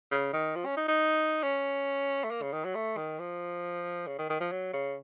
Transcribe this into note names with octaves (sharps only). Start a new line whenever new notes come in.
C#3
D#3
F3
C#4
D#4
D#4
C#4
A3
A#3
C#3
D#3
F#3
A3
D#3
F3
C#3
D#3
D#3
F3
F#3
C#3